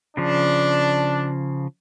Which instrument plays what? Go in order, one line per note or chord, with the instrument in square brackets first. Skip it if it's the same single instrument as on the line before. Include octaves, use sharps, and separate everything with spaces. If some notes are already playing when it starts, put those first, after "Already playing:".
[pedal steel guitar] C#3 F3 [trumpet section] D4